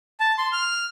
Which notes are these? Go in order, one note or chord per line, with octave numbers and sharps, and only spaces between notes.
A5
C6
F6